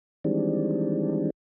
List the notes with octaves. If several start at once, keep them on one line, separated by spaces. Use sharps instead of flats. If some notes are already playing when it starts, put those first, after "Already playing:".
D#3 E3 G3 G#3 C4 D4